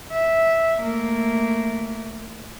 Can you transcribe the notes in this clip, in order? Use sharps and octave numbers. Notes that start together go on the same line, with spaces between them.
E5
A3 A#3